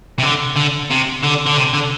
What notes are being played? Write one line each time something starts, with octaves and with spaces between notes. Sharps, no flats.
C3
D3
D3
C3
D3
D3
C3
D3